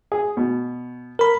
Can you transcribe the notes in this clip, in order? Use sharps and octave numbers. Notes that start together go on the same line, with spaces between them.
G#4
B2
A#4 B5